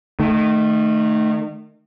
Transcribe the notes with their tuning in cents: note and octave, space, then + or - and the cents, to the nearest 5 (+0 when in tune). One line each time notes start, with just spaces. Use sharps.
D#3 -25 A3 +0